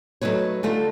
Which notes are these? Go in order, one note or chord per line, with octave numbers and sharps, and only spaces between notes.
F#3 A3 D#4 B4 C#5
D3 A3 D#4 F4